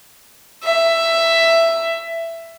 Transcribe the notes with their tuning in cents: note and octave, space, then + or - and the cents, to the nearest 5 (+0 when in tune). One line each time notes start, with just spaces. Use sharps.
E5 +10